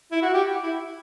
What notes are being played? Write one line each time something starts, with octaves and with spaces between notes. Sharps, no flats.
E4
F#4
G4
E4